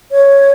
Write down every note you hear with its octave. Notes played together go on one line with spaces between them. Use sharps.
C#5